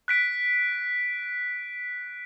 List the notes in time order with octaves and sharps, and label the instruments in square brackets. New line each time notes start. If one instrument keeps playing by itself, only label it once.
[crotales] F#6 B6 D7